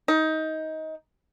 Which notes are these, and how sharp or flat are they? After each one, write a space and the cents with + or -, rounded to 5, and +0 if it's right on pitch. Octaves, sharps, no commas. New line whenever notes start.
D#4 +20